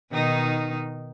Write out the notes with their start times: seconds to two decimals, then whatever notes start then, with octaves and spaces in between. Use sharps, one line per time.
0.11 B2 D#3 D#4